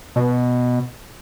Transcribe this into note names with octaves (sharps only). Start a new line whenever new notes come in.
B2